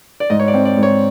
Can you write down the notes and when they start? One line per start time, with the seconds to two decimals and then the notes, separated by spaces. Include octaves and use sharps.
0.20 D5
0.30 G#2 D#5
0.40 C#5
0.48 D5
0.54 C4
0.65 D5
0.77 G#2
0.83 C#5